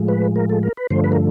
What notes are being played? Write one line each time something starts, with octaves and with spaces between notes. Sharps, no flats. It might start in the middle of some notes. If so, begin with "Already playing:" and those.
Already playing: A2 F3 G#3
B4
A#4
A4
A#4
B4
G2 D3 F3 A3 C5
B4
A#4